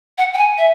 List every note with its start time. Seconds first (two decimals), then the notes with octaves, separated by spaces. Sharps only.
0.18 F#5
0.33 G5
0.37 G#5
0.58 E5